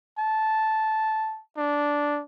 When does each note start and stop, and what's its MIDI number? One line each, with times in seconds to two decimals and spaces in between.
0.19 1.41 81
1.57 2.22 62